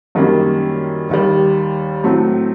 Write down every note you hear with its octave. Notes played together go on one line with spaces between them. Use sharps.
F#2 D#3 G3 A#3 C#4
D#2 D#3 G3
A2 F#3 A3 C4